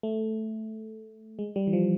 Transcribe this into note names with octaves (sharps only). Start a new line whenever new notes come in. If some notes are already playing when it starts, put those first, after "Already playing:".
A3
G#3
G3
E3
F3